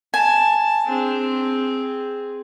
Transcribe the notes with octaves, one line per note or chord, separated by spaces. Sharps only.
G#5 A5
C4 D4 G#4
G#4